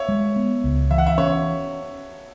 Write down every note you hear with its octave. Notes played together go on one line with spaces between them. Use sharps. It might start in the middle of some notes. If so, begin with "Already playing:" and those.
Already playing: C#5 E5
G#3
B3
C#2
E3 E5
F#5
E5
C#4 C#5